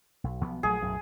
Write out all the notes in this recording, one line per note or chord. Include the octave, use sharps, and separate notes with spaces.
B1
B1 F3 B3
A#1 F#3 A3 G#4
B1 F#2 A2